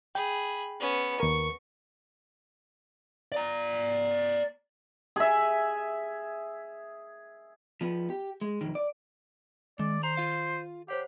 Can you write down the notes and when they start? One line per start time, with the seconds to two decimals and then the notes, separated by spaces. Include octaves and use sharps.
0.15 G#4 G5 B5
0.80 B3 C#4
1.20 D#2 A#4 C#6
3.32 D5 A#5
5.16 G#4 E5
7.81 F3 B3
8.10 G4
8.41 G#3
8.61 B1 F2 D#3
8.75 D5
9.79 D#3 G#3 D5
10.03 C5 A#5
10.17 F4 F5
10.88 G4 C5 C#5 F#5